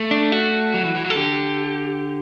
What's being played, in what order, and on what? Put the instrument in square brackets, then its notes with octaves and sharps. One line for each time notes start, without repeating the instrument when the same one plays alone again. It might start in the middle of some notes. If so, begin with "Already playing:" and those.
Already playing: [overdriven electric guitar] A3
[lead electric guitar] D4
F#4
[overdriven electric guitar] F#3
E3
E3
F#3
[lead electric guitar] A4
[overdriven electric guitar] D3 [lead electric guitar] G4